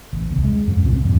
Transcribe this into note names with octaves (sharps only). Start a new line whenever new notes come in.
A1
D#1 C2
G#3
F2
C2 A#2 C4
D#1 E2 G2 C4